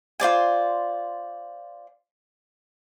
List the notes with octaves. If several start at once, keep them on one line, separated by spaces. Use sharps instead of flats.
F4 C5 D5 G#5